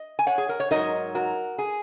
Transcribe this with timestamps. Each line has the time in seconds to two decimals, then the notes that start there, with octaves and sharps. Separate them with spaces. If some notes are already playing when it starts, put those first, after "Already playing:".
Already playing: D#5
0.19 G#5
0.27 C#5 F#5
0.38 G#4
0.49 A#4
0.60 C#5
0.71 G#2 F#3 D#4 A#4 D#5
1.15 F#4 A#4
1.58 G#4